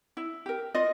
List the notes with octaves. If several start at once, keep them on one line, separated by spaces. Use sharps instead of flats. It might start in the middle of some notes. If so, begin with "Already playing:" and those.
E4
G4 A#4
F4 D#5